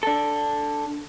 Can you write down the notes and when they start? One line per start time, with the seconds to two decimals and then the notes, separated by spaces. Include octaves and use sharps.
0.03 D4 A4